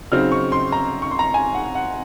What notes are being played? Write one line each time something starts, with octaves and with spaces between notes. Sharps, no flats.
C#3 F#3 C4 D#4 F6
C#6
C6
A#5
C#6
C6
A#5
G#5
F#5
F#5